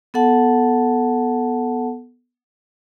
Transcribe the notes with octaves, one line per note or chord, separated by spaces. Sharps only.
B3 A4 F#5 A5